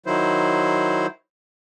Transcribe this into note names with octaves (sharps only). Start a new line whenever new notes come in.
D#3 F#3 E4 C5